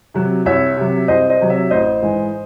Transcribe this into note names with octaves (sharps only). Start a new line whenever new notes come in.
C3 F#3
C2 C#5 E5
C3 F#3
C2 C5 D#5
C5 D#5
C3 F#3
C#5 E5
A1 C5 D#5
G#2 E3